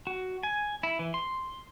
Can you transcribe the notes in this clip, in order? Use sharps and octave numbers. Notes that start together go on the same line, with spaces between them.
F#4
G#5
E4
E3
C6